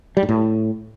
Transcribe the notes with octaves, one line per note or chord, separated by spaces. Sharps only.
G3
G#2
A2